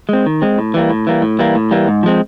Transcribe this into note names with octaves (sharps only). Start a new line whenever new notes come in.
G#3 C4
D#3
G#3 C4
A2
E3 G3 A#3
A2
E3 G3 A#3
A2
E3 G3 A#3
A2
E3 G3 A#3
G#2
F3 G#3 C4